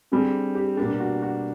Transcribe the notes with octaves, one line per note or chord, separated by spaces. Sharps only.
D3 G3 C4 G#4
G4
B2 G3 A#3 D4 G4
F#4
F#4